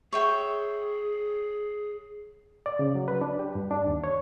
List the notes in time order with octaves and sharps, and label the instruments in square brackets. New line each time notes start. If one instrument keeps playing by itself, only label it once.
[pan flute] G#4 [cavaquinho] C#5 E5 G5
[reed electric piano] D5
C#3
F#3
B4
D4
G4
G2
D4
D#2
C#5